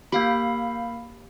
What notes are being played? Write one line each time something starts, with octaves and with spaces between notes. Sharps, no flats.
A#3 G4 F5 B5